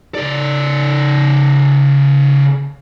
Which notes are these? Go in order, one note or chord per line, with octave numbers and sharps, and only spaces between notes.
C#3 D5